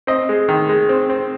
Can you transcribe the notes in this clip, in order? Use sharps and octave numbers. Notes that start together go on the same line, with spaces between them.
C4 D#5
G#3
D#3
G#3
C4
C4